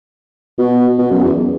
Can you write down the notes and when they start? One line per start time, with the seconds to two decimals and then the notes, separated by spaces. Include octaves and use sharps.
0.59 B2
0.98 B2
1.11 F#2
1.24 E2